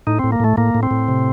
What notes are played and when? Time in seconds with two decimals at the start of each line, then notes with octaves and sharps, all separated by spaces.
0.07 A2 D#4
0.19 A2 C4
0.32 A#3
0.40 A2 A3
0.57 A2 A#3
0.75 A2
0.83 C4
0.91 A2
1.08 C3